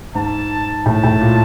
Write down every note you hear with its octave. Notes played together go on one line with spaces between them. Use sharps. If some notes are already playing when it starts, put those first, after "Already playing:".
G#2 A5
A2 A5
A2
A#2